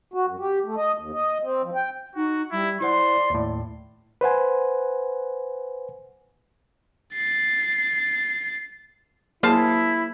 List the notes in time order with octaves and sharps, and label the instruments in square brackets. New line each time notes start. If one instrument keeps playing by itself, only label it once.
[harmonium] F#4
F#2
G4
A3
D#5
D#2
D#5
C4
F3
G5
[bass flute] D#4 [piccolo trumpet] F#4
[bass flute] G3 [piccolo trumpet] E4
[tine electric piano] E4 C5 F#5 [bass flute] D5 [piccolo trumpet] C6
[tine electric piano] D#2 A2
[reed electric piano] B4 C5 F#5 G#5
[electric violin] A6 C7
[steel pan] F#3 A#3 G#4 [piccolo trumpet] E4 [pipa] C5 F5 A5